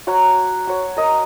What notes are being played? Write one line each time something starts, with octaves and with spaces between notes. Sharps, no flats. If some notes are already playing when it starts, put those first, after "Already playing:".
F#4 C#5 F#5 A#5
F#4 C#5
A#4 D#5